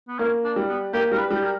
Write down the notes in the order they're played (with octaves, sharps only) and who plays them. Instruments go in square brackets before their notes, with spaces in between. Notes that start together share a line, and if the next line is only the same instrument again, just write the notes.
[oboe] B3
[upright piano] A#3 [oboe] C#4
[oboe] D4
[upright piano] G3
[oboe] B3
[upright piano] A#3 [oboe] G4
[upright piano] G3 [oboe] A#4
[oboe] B4
[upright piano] G3 [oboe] G4
[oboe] A#4